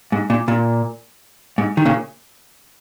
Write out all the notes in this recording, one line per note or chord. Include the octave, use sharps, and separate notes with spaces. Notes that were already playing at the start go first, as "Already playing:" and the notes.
G#2
A#2
A#2
G#2
D#3
A#2 C#3